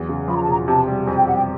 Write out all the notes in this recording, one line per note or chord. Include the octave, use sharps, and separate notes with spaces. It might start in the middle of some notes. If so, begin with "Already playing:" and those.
Already playing: E2 F#3
C#3
F3 B5
A#5
A5
E1 A#5
C3 A5
G3
F2 G#5
G5
G3 F#5
G5